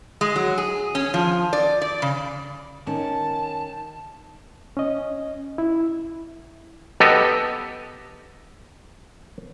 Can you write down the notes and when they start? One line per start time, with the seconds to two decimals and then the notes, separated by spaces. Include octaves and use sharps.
0.21 G#3
0.36 F#3
0.58 G#4
0.95 C#4
1.14 F3
1.53 D5
1.82 D5
2.02 C#3
2.87 D#3 C#4 A5
4.77 C#4 D#5
5.58 E4
7.00 B3 G4 A4 D#5